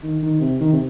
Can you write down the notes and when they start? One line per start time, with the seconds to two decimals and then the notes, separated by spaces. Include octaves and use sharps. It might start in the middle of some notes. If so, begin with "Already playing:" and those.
0.03 D#3
0.23 D#3
0.41 C3
0.60 D#3
0.73 C3